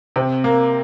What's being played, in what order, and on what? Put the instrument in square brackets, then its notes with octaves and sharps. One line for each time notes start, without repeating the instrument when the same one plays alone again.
[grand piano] C3 [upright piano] C4
[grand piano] A#3